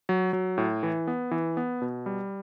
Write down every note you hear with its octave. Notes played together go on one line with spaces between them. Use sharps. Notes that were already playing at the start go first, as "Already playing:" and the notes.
F#3
F#3
A2
E3
B3
E3
B3
B2
G3